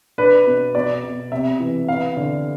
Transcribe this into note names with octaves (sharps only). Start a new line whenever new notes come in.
D4 B4
B2
B2 D5
B2
C3 E5
E3
B3 F5
D3